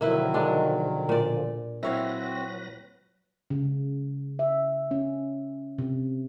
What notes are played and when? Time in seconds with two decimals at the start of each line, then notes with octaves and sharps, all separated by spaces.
0.01 B2 D3 D#3 F3 F#3 A#3 E4 B4
0.34 G#3 D4
1.09 A#2 D5
1.83 F#3 C4 E4 F#4 B4 C#5 F5 A#6
3.50 C#3
4.39 E5
4.91 C#4
5.78 C3